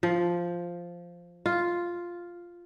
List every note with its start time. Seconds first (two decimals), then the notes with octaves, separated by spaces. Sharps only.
0.03 F3
1.46 F4